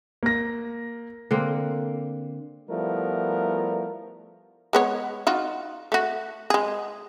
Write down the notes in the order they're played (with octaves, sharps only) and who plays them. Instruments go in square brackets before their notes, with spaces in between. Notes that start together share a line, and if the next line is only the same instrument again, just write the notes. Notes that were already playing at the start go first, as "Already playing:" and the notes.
[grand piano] A#3 A#6
[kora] D3 A#3 C4
[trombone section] F3 G3 A3 B3 E4 A#4
[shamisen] G#3 B3 C#5
D#4 F4 F#4
A3 F#4
G#3 G#4